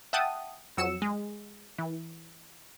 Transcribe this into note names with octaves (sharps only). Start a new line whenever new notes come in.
E5 F#5 G5 A5 D#6
F2 F#3 E6 C#7 E7
G#3
E3